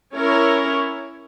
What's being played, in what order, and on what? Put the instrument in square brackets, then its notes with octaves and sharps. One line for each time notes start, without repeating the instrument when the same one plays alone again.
[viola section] C#4 E4 A#4 C#5